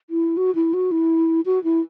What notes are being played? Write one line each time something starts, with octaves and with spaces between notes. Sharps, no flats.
E4
F#4
E4
F#4
E4
F#4
E4